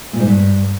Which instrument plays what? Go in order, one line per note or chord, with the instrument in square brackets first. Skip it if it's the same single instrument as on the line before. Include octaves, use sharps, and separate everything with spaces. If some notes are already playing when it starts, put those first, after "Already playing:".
[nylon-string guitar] A#2
G#2
G2